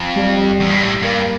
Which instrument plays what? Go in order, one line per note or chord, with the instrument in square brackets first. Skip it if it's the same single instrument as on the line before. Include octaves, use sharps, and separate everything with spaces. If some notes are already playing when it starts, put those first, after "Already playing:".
Already playing: [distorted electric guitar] F2
[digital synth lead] G3
[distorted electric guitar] E2
G2
A2
[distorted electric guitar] G2 [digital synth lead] A#3